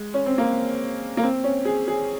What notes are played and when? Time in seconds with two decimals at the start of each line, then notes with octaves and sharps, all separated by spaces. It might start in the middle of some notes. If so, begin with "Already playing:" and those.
Already playing: G#3
0.14 C#4
0.26 C4
0.38 A#3
1.17 A#3
1.23 C4
1.44 C#4
1.65 G#4
1.88 G#4